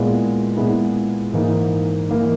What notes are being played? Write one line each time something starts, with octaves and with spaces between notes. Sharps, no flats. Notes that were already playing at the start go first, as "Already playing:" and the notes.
Already playing: A#2 G#3 B3 E4
A#2 G#3 B3 E4
G#2 E3 A#3 D#4
E3 A#3 D#4